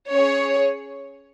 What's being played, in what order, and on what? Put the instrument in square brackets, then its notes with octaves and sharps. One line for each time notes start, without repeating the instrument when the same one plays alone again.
[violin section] C#4 G#4 C#5